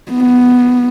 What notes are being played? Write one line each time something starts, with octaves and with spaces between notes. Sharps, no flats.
B3